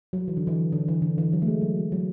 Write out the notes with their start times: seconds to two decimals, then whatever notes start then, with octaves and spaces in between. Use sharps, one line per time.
0.13 F#3
0.28 E3
0.37 D3
0.47 E3
0.72 D3
0.88 E3
1.02 D3
1.18 E3
1.33 F#3
1.42 A3
1.47 G#3
1.61 F#3
1.76 F#3
1.92 F#3